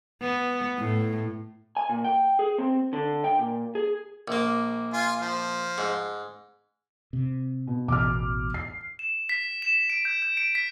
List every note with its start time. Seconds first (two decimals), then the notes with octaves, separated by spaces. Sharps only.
0.22 B3
0.78 A2
1.77 G#5
1.89 A#2
2.04 G5
2.39 G#4
2.58 C4
2.93 D3
3.24 G5
3.39 A#2
3.75 G#4
4.28 A#1 A#3
4.93 F4 G#5
5.21 F3
5.78 G#2
7.13 C3
7.67 B2
7.88 A1 E2 B2 D6 F6
8.54 C7
8.99 E7
9.29 B6
9.62 E7
9.90 D7
10.05 G6
10.22 G6
10.37 D7
10.55 B6